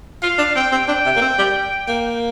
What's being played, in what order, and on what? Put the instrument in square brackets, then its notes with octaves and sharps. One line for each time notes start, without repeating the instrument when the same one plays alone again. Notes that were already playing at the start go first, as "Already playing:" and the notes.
[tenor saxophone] F4 [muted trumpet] F5
[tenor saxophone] D4
[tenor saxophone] C4 [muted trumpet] G5
[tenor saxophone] C4
[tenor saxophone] D4 [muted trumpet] G5
[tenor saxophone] C3
A#3
C4
G3
A#3